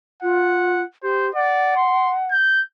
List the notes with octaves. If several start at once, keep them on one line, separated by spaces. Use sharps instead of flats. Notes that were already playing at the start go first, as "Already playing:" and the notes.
F4 F#5
G4 C5
D5 F#5
C6
G6